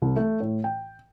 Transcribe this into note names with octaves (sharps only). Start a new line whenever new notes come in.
C2
A3
A2
G5